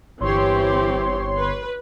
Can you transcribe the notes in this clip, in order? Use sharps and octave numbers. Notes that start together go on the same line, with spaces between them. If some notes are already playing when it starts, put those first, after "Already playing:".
G1 E3 C4 G4 C#5 C6
B4